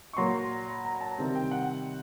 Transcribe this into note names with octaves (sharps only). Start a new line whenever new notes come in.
C#6
A#2 F#3 A#3 C6
B5
A#5
A5
C3 D#3 G3 C4
G5
F#5